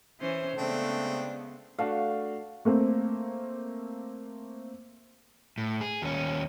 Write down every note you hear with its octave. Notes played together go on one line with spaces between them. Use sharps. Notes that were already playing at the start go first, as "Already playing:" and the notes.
E3 C#4 C5
C#3 G#3 A3 B3 C4 D4
A3 D4 F#4 F5
A3 A#3 C4
A2
G#4
D#2 C#4